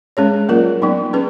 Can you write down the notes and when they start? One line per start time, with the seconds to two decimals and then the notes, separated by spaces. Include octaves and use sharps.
0.17 G#3 C#4 G#4 C#5
0.49 F#3 A#3 F4 A#4
0.82 F#3 B3 D#4
1.13 C#4 G#4 B4